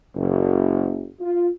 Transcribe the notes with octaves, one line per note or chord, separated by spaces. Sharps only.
F#1
F4